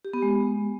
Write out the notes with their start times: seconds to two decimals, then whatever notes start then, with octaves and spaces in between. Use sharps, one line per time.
0.05 G4
0.14 B3
0.22 G#3